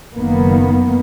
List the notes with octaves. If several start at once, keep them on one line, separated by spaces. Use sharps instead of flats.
F#1 D#3 A#3 B3